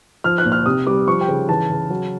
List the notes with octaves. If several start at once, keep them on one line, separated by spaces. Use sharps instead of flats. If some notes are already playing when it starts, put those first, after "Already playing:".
F3 F6
F#6
A#2
F6
C3 D#6
G3 D6
F3 C#6
G5
C#3
E3 A5
C#3
F#3